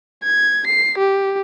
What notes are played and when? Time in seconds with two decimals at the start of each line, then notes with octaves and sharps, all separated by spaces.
0.24 G#6
0.67 C7
0.98 G4